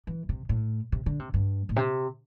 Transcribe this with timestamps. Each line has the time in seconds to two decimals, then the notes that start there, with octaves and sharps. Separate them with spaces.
0.07 E3
0.29 C3
0.49 A2
0.92 C3
1.06 D3
1.19 C3
1.34 G2
1.69 A2
1.76 C3